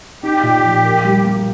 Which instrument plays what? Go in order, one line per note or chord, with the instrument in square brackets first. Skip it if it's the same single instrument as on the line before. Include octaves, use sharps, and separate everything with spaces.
[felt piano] D#4 [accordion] G4
[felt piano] A#2
F3
A#4
G3
A#3